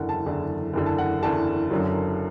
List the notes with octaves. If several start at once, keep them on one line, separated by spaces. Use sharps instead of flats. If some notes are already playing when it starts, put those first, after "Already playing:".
Already playing: F#1 E2 D3 F#5
A5
F#1 E2 D3
F#1 E2 D3
A5
F#5
F#1 E2 D3 A5
F#1 F#2 D3 F#3